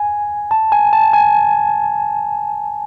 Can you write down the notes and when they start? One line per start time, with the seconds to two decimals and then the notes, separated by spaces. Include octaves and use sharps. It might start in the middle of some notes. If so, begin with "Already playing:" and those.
Already playing: G#5
0.51 A5
0.72 G#5
0.93 A5
1.13 G#5